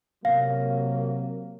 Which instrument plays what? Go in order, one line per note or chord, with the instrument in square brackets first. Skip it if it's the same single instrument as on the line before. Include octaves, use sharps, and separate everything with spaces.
[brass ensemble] C3 F#3 A#3 [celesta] F5